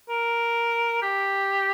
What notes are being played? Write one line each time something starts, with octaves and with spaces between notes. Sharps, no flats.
A#4
G4